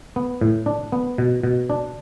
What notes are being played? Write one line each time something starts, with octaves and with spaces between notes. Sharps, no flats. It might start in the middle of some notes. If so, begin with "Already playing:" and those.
B3
A2
D4
B3
B2
B2
D4